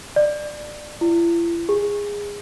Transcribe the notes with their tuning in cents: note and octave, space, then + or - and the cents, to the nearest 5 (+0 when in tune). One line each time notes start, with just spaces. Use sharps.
D5 +20
E4 +45
G#4 -20